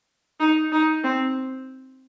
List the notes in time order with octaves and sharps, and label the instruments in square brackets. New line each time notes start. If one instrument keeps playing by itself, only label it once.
[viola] D#4
D#4
C4